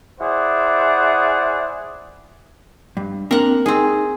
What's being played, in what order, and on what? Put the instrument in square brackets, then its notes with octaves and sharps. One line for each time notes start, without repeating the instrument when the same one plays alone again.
[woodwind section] E4 G#4 C5 D5 F#5
[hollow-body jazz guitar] G2
[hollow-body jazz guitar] A#3 C4 D4 [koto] A#4 F#5
[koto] C4 G#4 [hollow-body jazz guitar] D#4